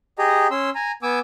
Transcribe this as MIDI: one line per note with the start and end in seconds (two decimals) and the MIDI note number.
0.18 0.47 67
0.18 0.47 68
0.18 0.47 75
0.18 0.47 82
0.51 0.70 61
0.51 0.70 84
0.51 0.70 88
0.75 0.92 80
0.75 0.92 82
1.03 1.19 59
1.03 1.19 80
1.03 1.19 86
1.03 1.19 88